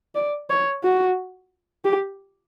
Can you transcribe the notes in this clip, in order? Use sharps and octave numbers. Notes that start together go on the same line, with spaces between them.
D5
C#5
F#4
G4